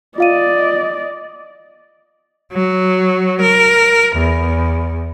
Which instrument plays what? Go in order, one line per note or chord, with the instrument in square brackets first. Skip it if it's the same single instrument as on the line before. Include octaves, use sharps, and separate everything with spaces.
[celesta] F4 F5 D#7 [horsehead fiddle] D5 D#5
[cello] F#3
A#4
E2